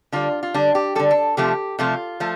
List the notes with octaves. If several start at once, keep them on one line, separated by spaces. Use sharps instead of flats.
D3 G3 F4
F4
D3 G3 D4
G4
D3 G3 A4
A4
C3 F3 A3 G4
C3 F3 A3 F4
F3 A3